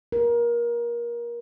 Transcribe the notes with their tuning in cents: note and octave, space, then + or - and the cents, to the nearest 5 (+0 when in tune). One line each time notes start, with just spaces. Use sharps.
A#4 +25